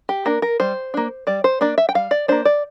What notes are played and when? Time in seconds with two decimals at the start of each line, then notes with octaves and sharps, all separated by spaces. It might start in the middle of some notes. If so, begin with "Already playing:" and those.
0.09 G4
0.25 A#3 D4 A#4
0.42 A#4
0.60 G3 C5
0.94 A#3 D4
1.27 G3 D5
1.44 C5
1.61 A#3 D4 D5
1.78 E5
1.89 G5
1.95 G3 F5
2.11 D5
2.28 A#3 D4 C5
2.45 D5